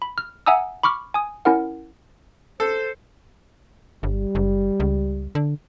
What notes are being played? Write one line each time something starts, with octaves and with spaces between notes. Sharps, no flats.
B5
F6
E5 F#5 G#5 A#5 D#6 E6
B5 C#6 D6 F6
G#5 D#6
C#4 E4 A#4 F#5
A4 C5
G1 G3
F#1
C#2
D3